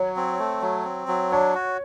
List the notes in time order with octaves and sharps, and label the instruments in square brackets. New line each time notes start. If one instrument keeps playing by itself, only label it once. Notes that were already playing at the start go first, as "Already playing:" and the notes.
Already playing: [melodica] F#3 [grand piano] C#5
[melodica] C4
A3
F#3
C4
F#3
[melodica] D4 [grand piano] C#5
[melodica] F#4